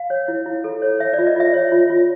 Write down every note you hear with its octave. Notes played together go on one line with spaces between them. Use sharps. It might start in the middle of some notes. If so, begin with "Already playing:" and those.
Already playing: F5
C#5
E4
E4
A4
C#5
C#5 E5
D5
F4
D#5
F4 E5
C#5
F4
F4